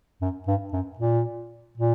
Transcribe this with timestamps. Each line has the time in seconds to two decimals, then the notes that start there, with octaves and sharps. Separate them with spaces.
0.22 F#2
0.47 G2
0.73 F#2
0.99 A#2
1.77 A#2